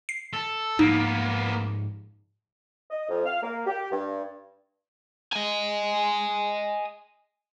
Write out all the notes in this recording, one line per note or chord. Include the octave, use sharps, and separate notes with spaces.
C7
A4
G#2 F3 A#3 B3 D#4
D#5
F2
F5
A#3
G4
G2
D#5 G#5